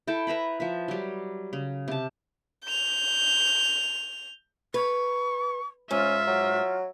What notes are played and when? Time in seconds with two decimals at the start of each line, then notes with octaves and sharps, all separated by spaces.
0.07 E4 A4 G5 A5
0.27 B4 E5 A#5 B5
0.60 F3 E5
0.88 F#3 G3
1.53 C#3
1.88 C3 A5
2.65 G6 F7
4.74 B4 C#6
5.91 G#2 C#4 F4 E5
6.27 F#3